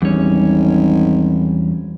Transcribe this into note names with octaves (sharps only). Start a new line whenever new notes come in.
G#1 E2 G3 C#4